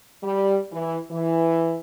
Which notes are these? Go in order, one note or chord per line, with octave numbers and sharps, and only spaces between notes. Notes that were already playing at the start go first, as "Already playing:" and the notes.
G3
E3
E3